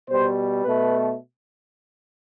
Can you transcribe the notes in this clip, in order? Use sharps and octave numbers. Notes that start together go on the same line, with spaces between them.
B2 G3 C5
B2 A3 B4